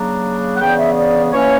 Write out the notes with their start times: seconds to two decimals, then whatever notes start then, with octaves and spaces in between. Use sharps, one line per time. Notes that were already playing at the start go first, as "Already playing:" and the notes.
Already playing: C#3 F#3 A#3 D4 A#5
0.56 F#5
0.61 C#3 E3 B3 D4 G5
0.79 E5
0.97 D5
1.33 E3 A#3 C#4 C#5